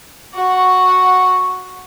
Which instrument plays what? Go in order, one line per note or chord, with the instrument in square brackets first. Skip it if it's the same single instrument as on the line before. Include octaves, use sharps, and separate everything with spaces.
[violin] F#4 F#5 [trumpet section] C#6